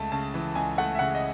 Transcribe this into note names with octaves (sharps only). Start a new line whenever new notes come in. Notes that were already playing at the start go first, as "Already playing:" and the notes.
Already playing: C#2 A3 A5
C#3 A5
E3
C#2 G#5
A3 F#5
E5
C#3 F#5
D#5